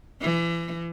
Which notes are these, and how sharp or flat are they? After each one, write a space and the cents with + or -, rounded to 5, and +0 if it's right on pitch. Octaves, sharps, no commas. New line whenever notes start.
E3 +35